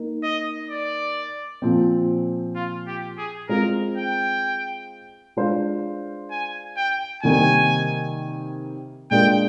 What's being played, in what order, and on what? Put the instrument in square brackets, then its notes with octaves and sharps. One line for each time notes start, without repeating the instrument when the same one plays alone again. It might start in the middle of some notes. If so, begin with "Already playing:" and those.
Already playing: [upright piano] A#3 D#4 A#4
[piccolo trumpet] D#5
D5
[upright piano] A#2 F3 C4
[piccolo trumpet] F4
G4
G#4
[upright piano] G#3 C4 F4 C5 [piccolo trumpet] A#4
[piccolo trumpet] G5
[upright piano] G#3 D4 F4 C5 F5
[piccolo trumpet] G#5
G5
[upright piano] C3 D#3 G3 A#3 [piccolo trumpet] G#5
[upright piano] A#2 G#3 D4 F4 A#4 [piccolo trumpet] G5